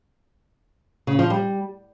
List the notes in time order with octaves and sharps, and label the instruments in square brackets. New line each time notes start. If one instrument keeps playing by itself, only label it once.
[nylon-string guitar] C#3
F3
G3